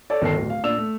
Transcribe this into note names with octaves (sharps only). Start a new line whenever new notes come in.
A4 C#5 D5
G1 D#3 A4 C7
D1
F5
A#2 D4 E6 F7
A3